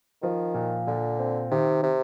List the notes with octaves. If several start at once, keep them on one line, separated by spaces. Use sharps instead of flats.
D#3 F3
A#2
A#2 D3
C4
C3 D#3
C3